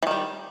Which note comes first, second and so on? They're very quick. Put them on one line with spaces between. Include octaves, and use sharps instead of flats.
E3 D#3 G3